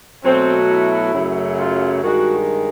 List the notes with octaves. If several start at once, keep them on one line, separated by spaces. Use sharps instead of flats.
B2 F#3 A3 C4
E4
F#2 C#3 F#3 A3
F4
G2 D#3 G#3 F#4